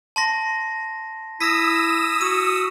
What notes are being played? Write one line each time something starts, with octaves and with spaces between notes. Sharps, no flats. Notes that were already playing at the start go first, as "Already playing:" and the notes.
A5 C6 A#6
E4 D#6 E6 A#6 B6
F#4 D#7